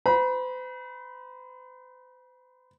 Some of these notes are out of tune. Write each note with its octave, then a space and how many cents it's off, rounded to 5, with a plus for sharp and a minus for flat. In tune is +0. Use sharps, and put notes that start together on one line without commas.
C5 -45 B5 -35